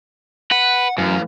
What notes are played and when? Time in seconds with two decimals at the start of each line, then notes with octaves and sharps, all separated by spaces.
0.51 B4 F#5
0.98 F#2 A2 E3 F5